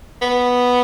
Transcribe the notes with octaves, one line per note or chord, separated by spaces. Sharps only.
B3